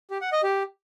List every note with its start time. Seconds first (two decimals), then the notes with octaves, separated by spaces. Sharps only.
0.11 G4
0.21 F#5
0.32 D#5
0.43 G4